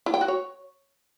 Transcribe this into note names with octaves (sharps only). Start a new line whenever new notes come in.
E4
G5
F#4
C#5